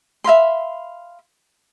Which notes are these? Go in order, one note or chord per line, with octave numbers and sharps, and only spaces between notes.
E5 F5 B5 C6